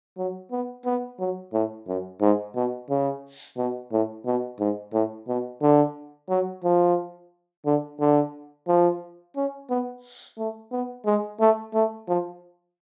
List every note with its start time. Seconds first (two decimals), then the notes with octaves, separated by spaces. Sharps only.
0.18 F#3
0.52 B3
0.86 B3
1.20 F#3
1.53 A2
1.88 F#2
2.21 G#2
2.55 B2
2.90 C#3
3.58 B2
3.92 A2
4.26 B2
4.60 G#2
4.93 A2
5.28 B2
5.62 D3
6.30 F#3
6.64 F3
7.66 D3
8.00 D3
8.68 F3
9.36 C#4
9.70 B3
10.38 A3
10.72 B3
11.06 G#3
11.40 A3
11.74 A3
12.08 F3